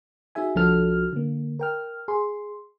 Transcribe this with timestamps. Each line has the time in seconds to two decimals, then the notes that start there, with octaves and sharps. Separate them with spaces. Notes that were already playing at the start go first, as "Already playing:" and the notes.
0.35 D#4 F#4 G#4 E5 G#5
0.55 C2 F3 D4 F#4 A4 F6
1.13 D3 A#3
1.59 A#4 G5 F6
2.08 G#4 C6